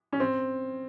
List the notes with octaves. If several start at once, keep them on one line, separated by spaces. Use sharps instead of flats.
C#4
C4